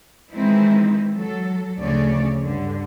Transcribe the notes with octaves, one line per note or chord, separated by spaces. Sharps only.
D#3 E3 G#3 C4 D#4 E4
F#3 A4
D2 C#3 F3 A3 C#5 D5
G2 D3